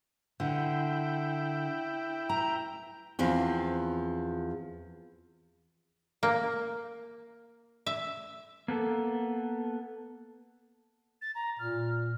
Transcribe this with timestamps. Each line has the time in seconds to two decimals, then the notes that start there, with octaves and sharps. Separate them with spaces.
0.40 D3 E4 G5
2.29 A#5
3.19 E2 F3 C4
6.23 A#3
7.86 E5
8.68 A#3 B3 A4
11.22 A6
11.35 A#5
11.59 A#2 F6